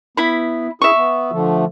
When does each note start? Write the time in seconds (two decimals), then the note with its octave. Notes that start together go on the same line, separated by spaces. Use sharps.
0.17 B3 E4 B5
0.82 E4 G#4 E5 C#6
0.96 B3
1.32 D3 F3 A3